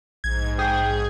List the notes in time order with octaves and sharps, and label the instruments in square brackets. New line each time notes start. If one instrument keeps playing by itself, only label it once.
[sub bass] A#1 [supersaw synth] G#2 [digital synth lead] G#6
[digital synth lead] G#4 [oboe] G5